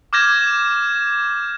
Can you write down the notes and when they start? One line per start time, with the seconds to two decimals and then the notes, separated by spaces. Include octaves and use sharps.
0.13 D6 F6 G6 G#6 A#6 E7